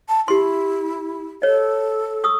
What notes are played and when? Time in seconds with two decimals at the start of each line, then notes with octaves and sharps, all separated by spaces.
0.09 A5
0.28 E4 G4 C6
1.42 A4 C#5 D#5
2.24 C#6 D#6 E6